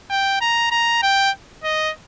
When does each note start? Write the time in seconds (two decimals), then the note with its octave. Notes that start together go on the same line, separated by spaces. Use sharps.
0.10 G5
0.41 A#5
0.71 A#5
1.03 G5
1.64 D#5